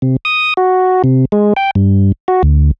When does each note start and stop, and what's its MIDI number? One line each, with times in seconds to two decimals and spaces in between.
0.02 0.16 48
0.25 0.54 87
0.57 1.02 66
1.04 1.25 48
1.32 1.53 56
1.56 1.71 79
1.75 2.12 43
2.28 2.42 66
2.43 2.71 38